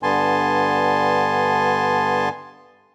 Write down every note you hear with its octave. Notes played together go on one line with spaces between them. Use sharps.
G2 D3 B3 G#5 A5 C6